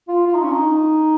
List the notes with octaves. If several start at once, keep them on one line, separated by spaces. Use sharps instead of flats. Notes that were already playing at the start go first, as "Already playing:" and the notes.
F4
F4
D#4
C#4
D#4